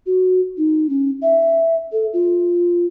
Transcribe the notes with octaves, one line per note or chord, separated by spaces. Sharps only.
F#4
D#4
C#4
E5
A4
F4